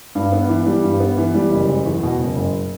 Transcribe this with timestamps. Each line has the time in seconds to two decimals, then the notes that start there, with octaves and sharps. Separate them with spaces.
0.15 G2
0.32 B3
0.49 E3
0.66 G3
0.84 G2
1.00 B3
1.18 E3
1.34 G3
1.51 F#1
1.69 F#1
1.86 E2
2.03 B2
2.19 F#1
2.36 F#1